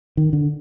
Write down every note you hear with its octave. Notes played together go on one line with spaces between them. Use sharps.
D#3
D3